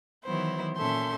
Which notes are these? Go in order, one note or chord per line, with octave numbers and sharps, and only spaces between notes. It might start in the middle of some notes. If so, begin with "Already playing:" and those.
D#3 E3 F#3 B3 E4 C5
A#2 C#4 A4 E5 C6 G6